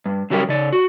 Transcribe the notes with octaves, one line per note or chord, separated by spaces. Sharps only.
G2
C#3 F#3 G3 G4 A#4
C#3 D5
F#4